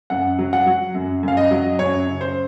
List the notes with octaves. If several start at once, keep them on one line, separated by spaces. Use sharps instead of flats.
F#2 F#5
F#3
F#5
F#3
F#2
F#2 F5
D#5
F#3
F#2 C#5
C#3
C5